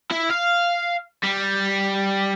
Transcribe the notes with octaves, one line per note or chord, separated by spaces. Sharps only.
E4
F5
G3